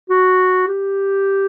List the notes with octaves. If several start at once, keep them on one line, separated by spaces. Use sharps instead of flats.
F#4
G4